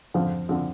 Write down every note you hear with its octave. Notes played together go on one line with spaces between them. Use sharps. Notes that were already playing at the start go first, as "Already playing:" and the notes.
F2 D3 F3 C4
D3 F3 C4